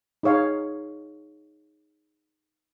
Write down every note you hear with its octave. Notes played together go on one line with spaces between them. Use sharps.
D#4 G#4 C#5 F5